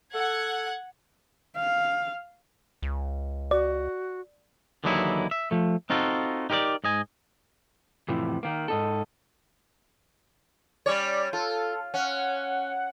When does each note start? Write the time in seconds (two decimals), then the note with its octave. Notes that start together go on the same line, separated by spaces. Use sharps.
0.15 A4 F#5 G#6
1.56 F5
2.82 C#2
3.51 F#4 D5
4.84 D#2 D3 E3 F#3 D#4 E4
5.31 E5
5.51 F3 A3
5.90 C4 D#4 F4 F#4 A4
6.50 D#4 G4 A#4 C5 D5
6.84 G#2 D#5 G#5
8.08 F2 A2 C3 E3
8.43 D#3 A#3
8.68 G#2 D#4 A4
10.86 G3 C#4 C#5 D5
11.33 F4 A4
11.94 C#4 F#5